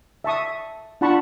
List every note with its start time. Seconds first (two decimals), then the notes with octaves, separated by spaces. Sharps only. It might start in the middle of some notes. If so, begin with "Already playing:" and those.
0.24 E5 A5 C#6 D#6
1.01 D4 F4 F#5 A5 B5 C#6